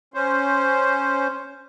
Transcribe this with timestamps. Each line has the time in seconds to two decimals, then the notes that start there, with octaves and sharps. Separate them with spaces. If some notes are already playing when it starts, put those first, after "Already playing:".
0.14 C#4 C5